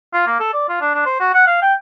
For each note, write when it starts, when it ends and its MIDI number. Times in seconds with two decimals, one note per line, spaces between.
0.14 0.25 65
0.27 0.38 58
0.40 0.49 69
0.54 0.68 74
0.69 0.78 65
0.81 0.92 62
0.94 1.02 62
1.06 1.18 72
1.20 1.33 66
1.34 1.47 78
1.47 1.61 77
1.62 1.74 79